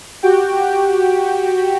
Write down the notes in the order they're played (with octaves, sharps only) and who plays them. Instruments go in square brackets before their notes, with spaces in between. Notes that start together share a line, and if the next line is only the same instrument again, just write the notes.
[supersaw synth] F#4 G4 G5